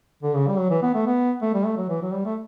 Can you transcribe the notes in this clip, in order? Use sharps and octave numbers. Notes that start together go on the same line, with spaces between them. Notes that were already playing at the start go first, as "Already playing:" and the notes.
D3
C#3
G3
F#3
E3
B3
A3
B3
A3
G3
A3
F#3
E3
F#3
G3
A3